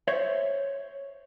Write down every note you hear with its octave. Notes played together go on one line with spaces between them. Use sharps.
C5 C#5 E5